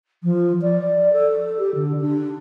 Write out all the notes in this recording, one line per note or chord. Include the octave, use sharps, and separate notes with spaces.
F3
D5
A4
G4
D3
D4